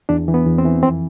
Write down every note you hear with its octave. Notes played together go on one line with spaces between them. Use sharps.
E2 D4
E3
B3
E2
C4
E3
F2 C4